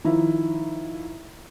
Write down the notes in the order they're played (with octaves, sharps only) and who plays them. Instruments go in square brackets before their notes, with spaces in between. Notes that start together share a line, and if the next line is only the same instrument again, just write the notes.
[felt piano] D#3 F3 E4